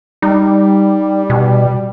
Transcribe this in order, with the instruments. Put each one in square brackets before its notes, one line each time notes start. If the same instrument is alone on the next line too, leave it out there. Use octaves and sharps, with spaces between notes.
[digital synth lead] G3 [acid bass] D#4
[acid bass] B2